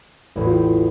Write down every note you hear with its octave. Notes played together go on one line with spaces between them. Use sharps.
A1 E2 A2
F4 G4